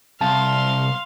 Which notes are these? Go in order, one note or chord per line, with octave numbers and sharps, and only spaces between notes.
C2 F5 A5 C6